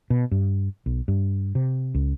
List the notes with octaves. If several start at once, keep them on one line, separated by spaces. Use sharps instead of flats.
B2
G2
B1
G2
C3
C#2